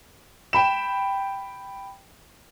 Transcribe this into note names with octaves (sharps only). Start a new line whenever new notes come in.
G5 B5 E7